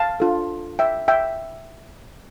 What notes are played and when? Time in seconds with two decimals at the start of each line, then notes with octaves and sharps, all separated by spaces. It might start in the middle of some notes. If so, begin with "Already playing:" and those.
Already playing: F5 A5
0.20 D4 F4 A4
0.79 E5 G5
1.08 E5 G5